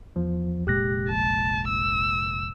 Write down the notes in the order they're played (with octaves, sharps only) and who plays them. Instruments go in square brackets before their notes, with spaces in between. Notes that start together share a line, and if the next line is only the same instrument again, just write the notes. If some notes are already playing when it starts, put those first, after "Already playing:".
[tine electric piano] E2 F3
[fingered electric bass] F1 A#2 G#3 [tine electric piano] G4 F#6 A#6
[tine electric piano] A#1 [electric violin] A5
[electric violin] E6